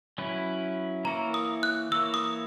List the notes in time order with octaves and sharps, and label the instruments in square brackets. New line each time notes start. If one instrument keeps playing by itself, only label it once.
[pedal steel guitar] F#3 C#4 E4 B4
[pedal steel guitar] E3 A#3 E4 A#4 C#5 [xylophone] A#5
[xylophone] D#6
F#6
[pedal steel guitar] E3 A#3 E4 A#4 C#5 [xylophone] E6
[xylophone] D#6